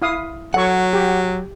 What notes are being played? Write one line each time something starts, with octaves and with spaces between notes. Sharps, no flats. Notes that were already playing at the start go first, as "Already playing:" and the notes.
E4 F5 D#6
F#3 A4 C#5 F#5 C#6
G4